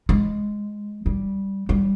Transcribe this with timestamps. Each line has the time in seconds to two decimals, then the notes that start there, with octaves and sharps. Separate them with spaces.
0.09 G#3
1.06 G3
1.69 G3